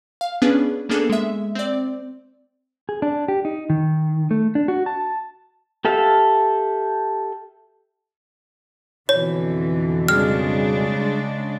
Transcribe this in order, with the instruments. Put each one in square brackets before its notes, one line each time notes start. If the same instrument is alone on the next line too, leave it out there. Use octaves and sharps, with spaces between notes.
[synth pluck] F5
B3 C#4 D4 G#4 B4
A#3 B3 D4 G#4 A4
G#3 E5
C4 D5
[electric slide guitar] G#4
D4
G4
D#4
D#3
A3
D4
F#4
A5
[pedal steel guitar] G4 A4 E5 F5
[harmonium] F2 B2 [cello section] D3 E3 [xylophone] C#5
[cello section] C#3 G#3 D4 [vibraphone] G3 G#4 [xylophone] F6